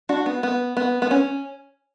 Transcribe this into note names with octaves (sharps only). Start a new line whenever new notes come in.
D4 F#4
B3
B3
B3
B3
C#4